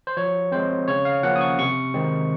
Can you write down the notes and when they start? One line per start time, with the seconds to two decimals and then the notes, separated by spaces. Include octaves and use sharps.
0.07 C5
0.17 F3 C#5
0.52 G#3 C4 C5
0.88 C#3 C#5
1.05 F5
1.23 F3 A#3 C#4 F#5
1.36 D#6
1.41 C#6
1.59 C3 C#6
1.94 D#3 G#3 C4